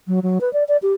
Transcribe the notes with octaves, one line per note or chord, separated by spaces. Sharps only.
F#3
F#3
B4
D5
D5
G4